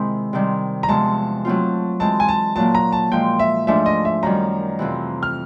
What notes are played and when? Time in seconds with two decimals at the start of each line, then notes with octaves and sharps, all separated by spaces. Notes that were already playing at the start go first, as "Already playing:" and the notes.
Already playing: C3 D#3 G#3 C4 E4
0.33 C3 D#3 G3
0.83 A#5
0.88 E2 C3 F3 G#3 A5
1.45 F#3 A3 C4 F4
2.00 E3 G#3 C4 A5
2.20 G#5
2.28 A5
2.56 A#2 F#3 A#3 A5
2.75 A#5
2.92 A5
3.12 A#2 F3 G#3 G5
3.39 E5
3.67 G#2 F3 A3 D4 E5
3.86 D#5
4.05 E5
4.23 F#2 D#3 G3 A#5
4.79 F2 C3 E3
5.23 F6